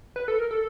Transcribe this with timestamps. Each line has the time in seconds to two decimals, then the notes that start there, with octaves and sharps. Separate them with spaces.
0.16 B4
0.28 A4
0.39 A#4
0.51 A4